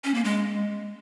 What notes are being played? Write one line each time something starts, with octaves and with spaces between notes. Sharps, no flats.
C#4
A#3
G#3